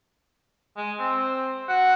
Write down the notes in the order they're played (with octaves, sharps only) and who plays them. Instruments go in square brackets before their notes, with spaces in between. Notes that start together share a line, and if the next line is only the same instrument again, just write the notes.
[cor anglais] G#3
C4
F#4